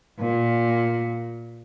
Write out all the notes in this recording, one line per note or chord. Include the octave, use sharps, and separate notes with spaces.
A#2